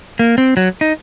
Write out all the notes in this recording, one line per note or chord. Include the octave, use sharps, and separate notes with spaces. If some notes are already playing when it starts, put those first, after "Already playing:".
A#3
C4
F#3
D#4